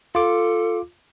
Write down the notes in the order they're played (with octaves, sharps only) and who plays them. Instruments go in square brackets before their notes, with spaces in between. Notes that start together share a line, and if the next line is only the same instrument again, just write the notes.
[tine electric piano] F4 D6 [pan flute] A4